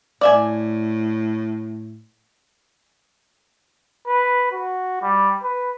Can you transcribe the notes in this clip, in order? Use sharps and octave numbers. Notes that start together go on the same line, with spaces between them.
A2 D5 E5 G#5
B4
F#4
G3
B4